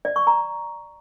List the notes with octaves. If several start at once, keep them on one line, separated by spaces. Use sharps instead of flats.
D5
C#6
A#5